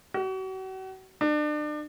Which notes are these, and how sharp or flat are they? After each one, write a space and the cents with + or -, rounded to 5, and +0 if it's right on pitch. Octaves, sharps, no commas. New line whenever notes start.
F#4 +40
D4 +35